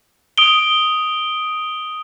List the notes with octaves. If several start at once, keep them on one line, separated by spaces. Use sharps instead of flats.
D#6 D7 G7